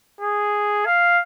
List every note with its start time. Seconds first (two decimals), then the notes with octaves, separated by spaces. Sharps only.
0.21 G#4
0.86 F5